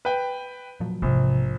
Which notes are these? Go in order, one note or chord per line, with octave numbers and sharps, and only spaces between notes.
B4 G5
A#2 F3 F#3
A#1 G#2 C3 E3